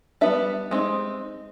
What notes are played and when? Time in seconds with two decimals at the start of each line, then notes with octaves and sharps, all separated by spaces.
0.21 G3 B3 D4 E5
0.71 G#3 C4 D#4